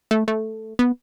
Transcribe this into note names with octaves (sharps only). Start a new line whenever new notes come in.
A3
A3
B3